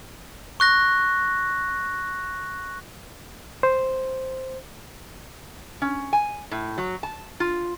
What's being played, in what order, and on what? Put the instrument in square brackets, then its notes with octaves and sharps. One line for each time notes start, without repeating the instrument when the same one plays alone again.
[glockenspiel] C#6 F#6 A#6
[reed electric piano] C5
[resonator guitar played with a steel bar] C#4
G#5
A2
F#3
A5
F4